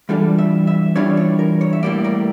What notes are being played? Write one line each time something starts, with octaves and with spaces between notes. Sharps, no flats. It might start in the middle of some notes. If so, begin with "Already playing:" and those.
E3 G3 D4 F4 A4
E5
E5
E3 G3 D4 F4 C#5
C#5
A#4
C#5
E5
A2 G3 A#3 D5
A#4